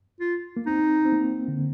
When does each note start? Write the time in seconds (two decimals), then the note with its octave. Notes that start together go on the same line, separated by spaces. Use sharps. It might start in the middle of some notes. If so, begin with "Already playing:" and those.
0.20 F4
0.57 A#3
0.66 C4 D#4
1.05 C4
1.12 A#3
1.48 D3